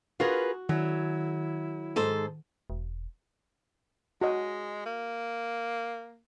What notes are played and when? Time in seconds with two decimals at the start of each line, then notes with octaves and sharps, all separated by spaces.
0.20 F4 F#4 G#4 A#4 B4
0.69 D#3 F#3 E4
1.96 G#2 A4 C5
2.70 E1
4.21 G#3 F#4 D#5
4.85 A#3